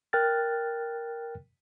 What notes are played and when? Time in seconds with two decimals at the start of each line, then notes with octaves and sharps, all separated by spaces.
0.13 A#4 G5 F6 F#6 A6